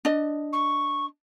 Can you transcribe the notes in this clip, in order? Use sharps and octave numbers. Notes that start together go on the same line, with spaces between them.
D4 D#5
C#6